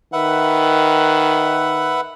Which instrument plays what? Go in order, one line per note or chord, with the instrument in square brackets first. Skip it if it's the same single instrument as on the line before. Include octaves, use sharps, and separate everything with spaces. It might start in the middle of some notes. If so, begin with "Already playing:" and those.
[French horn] D#3 [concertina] B4 E5 F#5